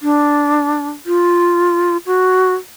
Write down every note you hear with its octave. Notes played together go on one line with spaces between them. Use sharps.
D4
F4
F#4